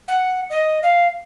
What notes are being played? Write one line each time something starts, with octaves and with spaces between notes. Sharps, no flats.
F#5
D#5
F5